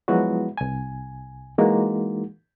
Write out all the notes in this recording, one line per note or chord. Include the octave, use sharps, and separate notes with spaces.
F3 F#3 G#3 B3 E4 F#4
C2 G#5
E3 G#3 A#3 D#4 F#4